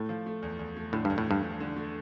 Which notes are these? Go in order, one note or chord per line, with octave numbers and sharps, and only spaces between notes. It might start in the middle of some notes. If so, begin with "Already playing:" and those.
Already playing: A2 A3
F3
A3
E2
E2
A3
A2 D3
E2 G2
A2
G2 A3
F3
D3
A3